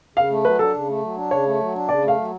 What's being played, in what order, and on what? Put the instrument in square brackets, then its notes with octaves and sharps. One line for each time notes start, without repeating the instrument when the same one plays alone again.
[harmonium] C#3 [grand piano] F5
[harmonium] A3
[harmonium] F#3 [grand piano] B4
[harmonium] D4 [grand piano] A4
[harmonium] C#3
A3
F#3
D4
[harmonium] C#3 [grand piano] C#5
[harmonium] A3
F#3
D4
[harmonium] C#3 [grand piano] D5
[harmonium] A3 [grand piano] F5
[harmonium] F#3